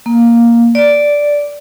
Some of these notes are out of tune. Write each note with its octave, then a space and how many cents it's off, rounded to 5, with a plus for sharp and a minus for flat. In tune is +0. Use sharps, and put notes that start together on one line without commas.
A#3 +5
D5 -5